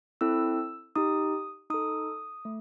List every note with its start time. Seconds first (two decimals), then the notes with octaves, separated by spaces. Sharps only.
0.21 C4 E4 A4 E6
0.96 D#4 G4 D#6
1.70 D#4 A4 D#6
2.45 A3